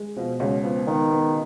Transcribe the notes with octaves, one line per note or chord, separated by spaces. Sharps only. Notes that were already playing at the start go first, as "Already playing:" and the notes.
Already playing: G#3
B2 F3
C#2 F#3
F3 B3
D#3 B3
B3